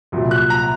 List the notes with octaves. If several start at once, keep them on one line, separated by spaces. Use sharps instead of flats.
C2 A#2 F#3
F#6
A#5